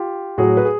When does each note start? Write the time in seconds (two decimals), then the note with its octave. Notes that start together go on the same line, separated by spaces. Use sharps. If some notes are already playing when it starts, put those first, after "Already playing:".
Already playing: F4 G4
0.38 A2 F#3 F#4 G#4
0.57 B4
0.65 G#4